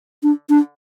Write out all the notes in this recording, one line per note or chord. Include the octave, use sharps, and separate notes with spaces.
D4
D4